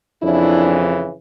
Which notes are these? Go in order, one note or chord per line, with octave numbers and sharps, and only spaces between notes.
F2 C#3 E3 D4 E4